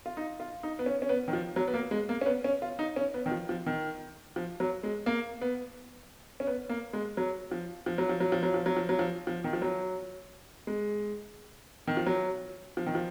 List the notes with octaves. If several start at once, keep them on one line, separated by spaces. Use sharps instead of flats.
F4
D#4
F4
D#4
B3
C#4
C#4
B3
D#3
F3
F#3
B3
A#3
G#3
A#3
C#4
B3
C#4
F4
D#4
C#4
B3
D#3
F3
F3
D#3
F3
F#3
G#3
A#3
B3
C#4
B3
A#3
G#3
F#3
F3
F3
F#3
F3
F#3
F3
F#3
F3
F#3
F3
F#3
F3
F3
D#3
F3
F#3
G#3
D#3
F3
F#3
F3
D#3
F3